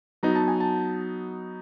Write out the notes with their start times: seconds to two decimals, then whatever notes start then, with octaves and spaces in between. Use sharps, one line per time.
0.23 F#3 B3 D#4 A#5
0.35 A5
0.48 G#5
0.60 A5